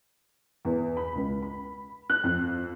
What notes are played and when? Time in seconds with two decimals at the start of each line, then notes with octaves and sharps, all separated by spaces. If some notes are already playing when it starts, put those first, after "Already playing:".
0.65 E2
0.97 B5
1.15 C#2
1.42 B5
2.10 F#6
2.24 F2